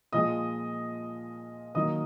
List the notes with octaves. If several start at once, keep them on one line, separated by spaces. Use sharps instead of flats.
A#2 F3 G#3 D#5 D#6
D#3 F#3 A#3 D#5 D#6